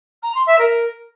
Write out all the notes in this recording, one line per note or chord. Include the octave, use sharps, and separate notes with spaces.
A#5
C6
E5
A#4